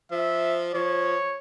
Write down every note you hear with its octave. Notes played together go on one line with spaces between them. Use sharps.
F3 E5
F3 C#5